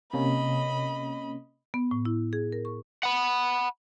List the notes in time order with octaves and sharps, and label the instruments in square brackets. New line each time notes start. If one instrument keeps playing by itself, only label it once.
[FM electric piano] C3 A#3 C#4 [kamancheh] D#5 B5
[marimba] B3
A2
E4
G#4
A#4
C#6
[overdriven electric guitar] F#5 B5